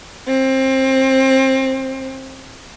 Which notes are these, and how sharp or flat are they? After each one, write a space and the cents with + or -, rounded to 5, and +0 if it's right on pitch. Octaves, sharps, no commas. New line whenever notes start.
C4 +25